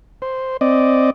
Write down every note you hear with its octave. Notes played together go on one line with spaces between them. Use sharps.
C5
C4 D5 D#5